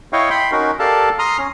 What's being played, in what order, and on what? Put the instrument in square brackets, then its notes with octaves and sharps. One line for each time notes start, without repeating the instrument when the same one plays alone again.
[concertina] E4 C#5 D#5 F5 G5 C#6
G5 B5 C6
C#4 D#4 F#4 A#4
G4 A4 A#4 D5 F5 A5
A#5 C6 D#6 F6
C#4